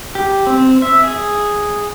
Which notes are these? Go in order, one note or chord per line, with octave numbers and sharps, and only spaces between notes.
G4
C4
E5
G#4